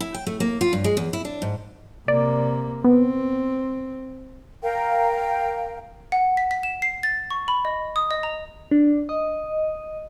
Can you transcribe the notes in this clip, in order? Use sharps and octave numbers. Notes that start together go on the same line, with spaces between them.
E4
G5
A3
A#3
F4
G2
G#3
E2
E4
D4
G#2
C3 A#3 D5
B3 C4
A#4 F5 G5
F#5
B6
B6
E7
C7
A6
C#6
B5
D#5
D#6
D#5
A#5
D4
D#5